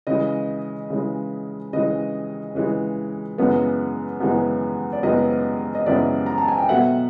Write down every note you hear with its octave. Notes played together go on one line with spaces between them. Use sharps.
C#3 E3 G#3 D#5
C#3 E3 G#3
C#3 E3 G#3 D#5
C#3 E3 G#3
F#2 C#3 E3 G#3 B3
F#2 C#3 E3 G#3 B3
D5
F#2 C#3 E3 G#3 B3 D#5
D#5
F#2 C#3 E3 G#3 B3 D5 E5
A#5
A5
G#5
G5
B2 F#3 A3 E5 F#5